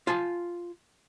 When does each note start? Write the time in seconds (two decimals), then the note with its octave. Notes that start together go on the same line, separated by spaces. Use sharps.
0.07 F4 G#5 A5